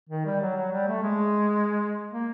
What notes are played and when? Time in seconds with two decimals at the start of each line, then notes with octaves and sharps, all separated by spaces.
0.09 D#3
0.26 G3
0.41 F#3
0.56 F#3
0.72 G3
0.87 A3
1.03 G#3
2.12 A#3